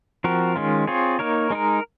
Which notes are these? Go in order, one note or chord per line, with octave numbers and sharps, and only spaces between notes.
F3 C4 F#4 A#4
D#3 G#3 C#4 F4
C4 F4 G#4 C#5
A#3 D#4 A#4 C#5
G#3 D#4 A#4